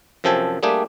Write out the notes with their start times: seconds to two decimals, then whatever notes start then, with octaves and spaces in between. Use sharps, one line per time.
0.24 F#2 C3 F3 A4 G5 G#5
0.63 G3 A3 A#3 D4 G4 G#4